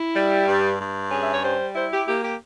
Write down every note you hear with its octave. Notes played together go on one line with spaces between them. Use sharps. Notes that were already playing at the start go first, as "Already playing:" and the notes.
Already playing: E4
G3
G2
G2
C#4 G#4
E5
C#5
G3 C5
E4 C5
G4
A#3 G4
G4